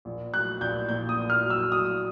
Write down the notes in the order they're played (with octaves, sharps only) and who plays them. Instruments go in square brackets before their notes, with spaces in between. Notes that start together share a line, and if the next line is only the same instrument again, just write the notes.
[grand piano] A#1
F#3 F#6
A#1 G6
A#2 G6
D#6
A#1
F6
F#3
E6
F#3 D#6